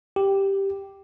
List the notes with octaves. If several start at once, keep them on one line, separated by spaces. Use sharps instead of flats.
G4